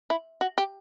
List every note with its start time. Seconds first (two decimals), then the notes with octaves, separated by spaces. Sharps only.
0.10 E4
0.41 F#4
0.58 G4